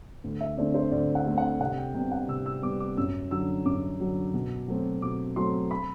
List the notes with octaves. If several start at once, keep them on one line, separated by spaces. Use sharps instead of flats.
D2
E5
D3 A3 C4 D5
C5
D2 D5
F#5
D3 A3 C4
F#5
C2 F#5
G5
C3 G3 B3 G5
F#5
C2 E6
E6
C3 G3 B3 D6
D6
F#2 E6
D3 F#3 E6
F#2 D6
D3 F#3
B2
F#3 A3 C4
B2 D6
F#3 A3 C4 C6
B5